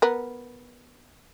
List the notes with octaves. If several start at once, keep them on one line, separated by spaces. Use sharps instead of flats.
B3 A#4